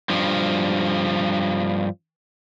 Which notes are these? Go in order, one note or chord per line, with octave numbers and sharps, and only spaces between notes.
G2 F3